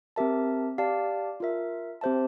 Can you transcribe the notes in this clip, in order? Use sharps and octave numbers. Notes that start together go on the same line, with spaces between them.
C4 G4 A#4 E5 A5
G4 D5 F5 A5
F4 A#4 E5
C4 G4 C5 E5 A5